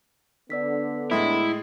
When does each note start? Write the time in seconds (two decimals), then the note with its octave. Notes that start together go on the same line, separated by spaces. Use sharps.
0.50 D3 B3 D5 E6 B6
1.11 A2 G#3 E4 D#6